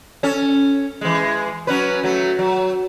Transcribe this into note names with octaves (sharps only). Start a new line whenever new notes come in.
C#4 A4
E3 G#3
F#3 C#4 B4
F#3 A3
F#3